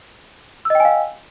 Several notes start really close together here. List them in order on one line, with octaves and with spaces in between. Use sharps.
E6 D#5 G5 G#5 F5